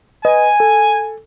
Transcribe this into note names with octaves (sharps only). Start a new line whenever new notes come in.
B4 D#5 G#5
A4